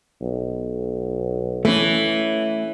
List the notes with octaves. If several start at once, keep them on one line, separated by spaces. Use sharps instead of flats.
B1
E3 A3 C#4